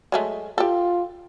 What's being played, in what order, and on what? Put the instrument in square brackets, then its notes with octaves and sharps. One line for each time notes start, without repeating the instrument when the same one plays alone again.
[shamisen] F#3 G#3 A3
[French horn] F4 [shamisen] G4 A4